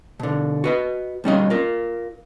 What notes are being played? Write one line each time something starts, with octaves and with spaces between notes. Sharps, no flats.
B2 D3
F#4 B4 D#5
B1 G3 C#4 D#5
F4 A#4